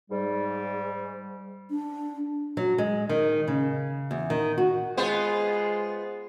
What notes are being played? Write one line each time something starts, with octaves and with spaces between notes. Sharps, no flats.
G#2 G3
D4
F#3
G#3
D#3
C#3
E2
D#3
F#4
G#3 B3 F4 C5